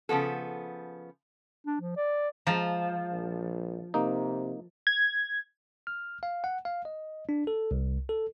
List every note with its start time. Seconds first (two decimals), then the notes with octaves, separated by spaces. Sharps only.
0.09 C#3 F3 B3 A4
1.67 D4
1.80 F3
1.96 D5
2.47 F3 G#3 A5 A#5
3.12 A#1
3.94 C3 A#3 D#4
4.87 G#6
5.87 F6
6.23 F5
6.44 F#5
6.65 F5
6.85 D#5
7.29 D4
7.47 A4
7.71 C2
8.09 A4